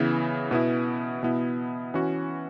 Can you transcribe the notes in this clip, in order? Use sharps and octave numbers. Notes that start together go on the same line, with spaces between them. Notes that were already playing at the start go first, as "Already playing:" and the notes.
Already playing: C#3 E3 B3 E4
B2 B3 E4
B2 B3 E4
E3 C#4 F#4